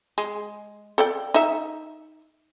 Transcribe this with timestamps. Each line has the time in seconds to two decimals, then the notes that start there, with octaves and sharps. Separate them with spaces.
0.18 G#3
0.98 A4 D5 G5
1.34 D#4 E5